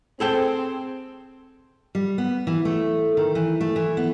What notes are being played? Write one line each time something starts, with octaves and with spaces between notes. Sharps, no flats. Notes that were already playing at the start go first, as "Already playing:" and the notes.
C4 G#4 A4 G5
G3
B3
E3
A3
D#3
E3
A3
E3
B3